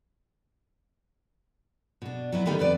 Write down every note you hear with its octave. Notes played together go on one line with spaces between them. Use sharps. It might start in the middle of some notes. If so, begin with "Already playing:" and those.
B2 D4
F#3 B3 E4
D3 D#3 G3 B3 D#4
F2 B3 B4 D5